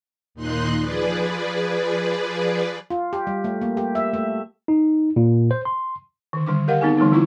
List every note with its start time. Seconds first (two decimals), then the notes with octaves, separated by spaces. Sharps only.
0.34 D#2 A#2 D#4 C6 F#6
0.79 F3 G#4 B4 D5
2.90 F4
3.13 G4
3.27 G3
3.44 A3
3.61 A#3
3.77 G4
3.95 E5
4.13 A3
4.68 D#4
5.16 A#2
5.51 C5
5.65 C6
6.33 D3 D#3
6.46 D3 G3 D4 D6
6.68 G4 A#4 D#5 F5 F#5
6.81 B3 C4 D#4 G#4 G#5
6.98 D3 E3 G3 A3 B3 D#4
7.11 E3 F3 C4 E4 F4 C#6